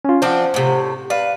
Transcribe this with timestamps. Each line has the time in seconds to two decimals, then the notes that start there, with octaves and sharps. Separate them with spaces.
0.05 C#4 F4
0.22 F3 C4 D4 C5 F#5
0.54 A2 C3
1.10 B4 D5 F5